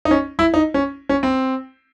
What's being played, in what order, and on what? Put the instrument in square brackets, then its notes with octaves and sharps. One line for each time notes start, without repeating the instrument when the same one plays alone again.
[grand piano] D#4
C#4
E4
D#4
C#4
C#4
C4